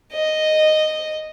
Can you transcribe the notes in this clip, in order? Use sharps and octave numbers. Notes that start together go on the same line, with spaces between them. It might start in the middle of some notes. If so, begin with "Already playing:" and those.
D#5